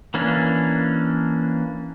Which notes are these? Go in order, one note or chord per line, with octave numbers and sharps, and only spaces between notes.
E3 A#3 C#4 D4